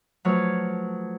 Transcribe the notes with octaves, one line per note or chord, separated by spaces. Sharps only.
F3 F#3 A3 B4 C#5 F5